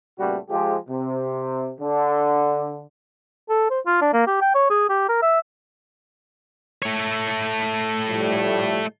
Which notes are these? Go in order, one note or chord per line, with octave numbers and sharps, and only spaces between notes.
A#2 C#3 G3 A3 B3 F#4
F3 G#3 G4
C3
D3
A4
C5
F4
D4
A#3
G4
G5
C#5
G#4
G4
A#4
E5
A3 C#5
A2 F3 G3